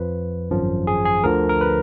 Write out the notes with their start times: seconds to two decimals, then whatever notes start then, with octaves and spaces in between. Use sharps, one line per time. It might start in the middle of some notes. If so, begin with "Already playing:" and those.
Already playing: F2 F3 B4
0.50 G#1 F#2 F3
0.87 G#4
1.05 G#4
1.24 D2 D3 F3 A#4
1.49 A#4
1.61 B4